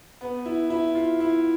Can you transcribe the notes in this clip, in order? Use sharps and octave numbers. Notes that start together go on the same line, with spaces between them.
B3
E4
E4
F4
E4